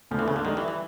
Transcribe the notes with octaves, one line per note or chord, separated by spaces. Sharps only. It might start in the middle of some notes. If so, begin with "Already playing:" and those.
D2 F3
E3
D2 C#3
D3
D#3 G3
E3
E3